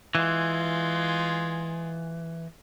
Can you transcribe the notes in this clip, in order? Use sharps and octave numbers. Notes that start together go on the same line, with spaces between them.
E3 G#3 F4